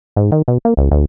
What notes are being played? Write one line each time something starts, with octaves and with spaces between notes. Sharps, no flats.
G#2
D#3
B2
A#3
C#2
D2